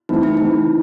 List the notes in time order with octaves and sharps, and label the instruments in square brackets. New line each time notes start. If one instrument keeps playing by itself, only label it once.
[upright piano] E3 A3 C4 E4 [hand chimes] D#4
[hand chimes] E4
[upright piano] E3 A3 C4 E4 [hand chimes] D#4